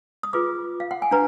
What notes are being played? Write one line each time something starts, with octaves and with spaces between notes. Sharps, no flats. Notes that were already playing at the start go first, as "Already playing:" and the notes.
D#6
F4 G#4 B4 D6
F5
F#5
G#5
D4 B4 A#5